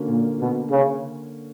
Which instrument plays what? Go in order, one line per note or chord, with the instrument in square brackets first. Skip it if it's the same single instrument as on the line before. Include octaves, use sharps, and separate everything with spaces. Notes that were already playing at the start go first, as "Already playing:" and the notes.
Already playing: [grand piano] D3 A#3 C#4 F#4
[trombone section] A#2
B2
C#3